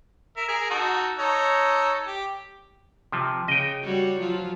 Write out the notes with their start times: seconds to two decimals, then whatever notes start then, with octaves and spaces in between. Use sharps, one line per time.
0.37 A#4 E5
0.48 G#4 A#4 G#5
0.70 D#4 F#4 A4
1.19 D#4 A4 C#5
2.06 G4
3.12 C3 F3
3.48 C#3 D#5 G5
3.83 G3 F#4 C#5
4.19 F3 F#3 F4